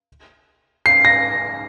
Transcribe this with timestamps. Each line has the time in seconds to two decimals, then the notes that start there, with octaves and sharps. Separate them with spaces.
0.86 C7
1.05 A#6